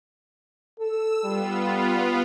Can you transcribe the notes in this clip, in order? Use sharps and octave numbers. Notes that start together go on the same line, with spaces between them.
A4 E6
G3 B3 F4